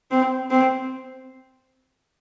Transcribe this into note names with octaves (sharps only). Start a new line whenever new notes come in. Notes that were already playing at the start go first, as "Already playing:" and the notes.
C4
C4